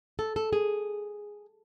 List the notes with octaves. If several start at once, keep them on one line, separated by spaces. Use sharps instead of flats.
A4
A4
G#4